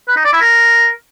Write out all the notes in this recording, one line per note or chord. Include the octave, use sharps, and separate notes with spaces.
B4
D#4
D5
E4
A#4